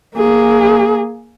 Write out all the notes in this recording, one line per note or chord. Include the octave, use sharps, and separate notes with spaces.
A#3 G#4